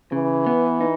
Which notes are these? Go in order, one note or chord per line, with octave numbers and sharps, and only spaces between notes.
C#3 E3
B3
D#4